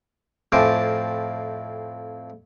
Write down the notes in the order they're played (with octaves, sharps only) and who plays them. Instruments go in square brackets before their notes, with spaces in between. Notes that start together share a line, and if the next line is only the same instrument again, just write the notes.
[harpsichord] F2 A2 C4 G#5 A5 D6